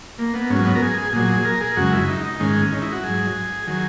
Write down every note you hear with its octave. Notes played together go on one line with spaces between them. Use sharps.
A#3
B3
G#2 F#3 C#4
B3
A#4
G#4
G#4
A#2 F#3 G#4
G#4
A#4
G#4
F#2 C#3 G#3 F#4
E4
D#4
D#4
G#2 D#3 G#3 C#4
D#4
E4
F#4
G#2 F#3 G#4
D#3 F#3 G#4